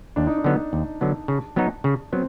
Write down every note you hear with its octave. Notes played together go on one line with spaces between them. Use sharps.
D#2 D4
D#4
D4
D3 F#3 B3
D#2
D3 F#3 B3
C#3
F#3 B3 D#4 F#4
C#3
F#3 B3 C4